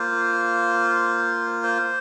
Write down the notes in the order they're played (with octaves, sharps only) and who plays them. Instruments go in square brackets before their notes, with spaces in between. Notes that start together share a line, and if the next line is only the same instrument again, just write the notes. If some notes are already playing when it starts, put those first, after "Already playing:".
Already playing: [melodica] A#3 F4 C5
C5